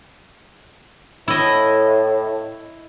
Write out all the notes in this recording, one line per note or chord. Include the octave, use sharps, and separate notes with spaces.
A2 E4 D#5